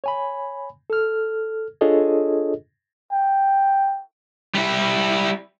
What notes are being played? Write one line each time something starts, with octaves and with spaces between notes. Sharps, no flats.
C#5 G#5 B5
A4 F6
D4 F4 G#4 A4 C#5 D#5
G5
G3 E4